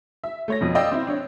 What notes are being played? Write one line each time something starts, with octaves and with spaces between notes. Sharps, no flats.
E5
A3 C#5 A#6
F2 B2 F3
D5 D#5 F5 G5 E6
C4 E4
D4 C#5